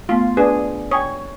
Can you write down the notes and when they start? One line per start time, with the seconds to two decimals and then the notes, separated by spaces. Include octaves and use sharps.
0.09 A3 B3 F4
0.37 D4 G#4 B4
0.91 C#5 G5 G#5 D#6